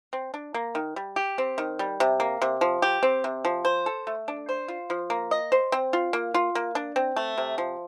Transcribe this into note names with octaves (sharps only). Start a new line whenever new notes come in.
C4
D4
A#3
D#3
G3
G4
C4
D#3
G3
C3
A#3
C3
F3
G4
C4
C3
F3
C5
A4
A3
D4
C5
F4
F3
A#3
D#5
C5
C4
F4
A#3
F4
A#3
D4
C4
A3
C3
F3